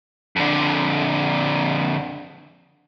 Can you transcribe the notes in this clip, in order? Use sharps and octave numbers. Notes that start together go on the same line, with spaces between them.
F2 D3